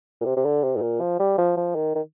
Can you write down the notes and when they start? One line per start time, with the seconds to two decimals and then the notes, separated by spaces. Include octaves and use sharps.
0.21 A#2
0.26 C3
0.36 C3
0.45 D3
0.64 C3
0.76 G#2
0.82 A#2
1.00 F3
1.19 G3
1.38 F3
1.57 F3
1.75 D#3
1.95 D#3